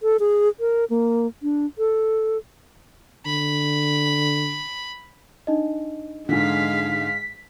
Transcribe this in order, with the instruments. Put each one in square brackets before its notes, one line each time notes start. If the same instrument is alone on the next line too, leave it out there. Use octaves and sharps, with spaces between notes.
[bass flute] A4
G#4
A#4
A#3
D4
A4
[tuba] D3 [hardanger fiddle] B5
[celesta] D4 D#4 D#5
[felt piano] G#2 D3 [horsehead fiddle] G#3 F5 [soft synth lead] B6